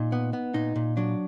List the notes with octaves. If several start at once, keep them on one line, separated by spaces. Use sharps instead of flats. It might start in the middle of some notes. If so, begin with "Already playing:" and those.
Already playing: A#2 D#4
B3
B3
A#2 D#4
A#2
F#3 D4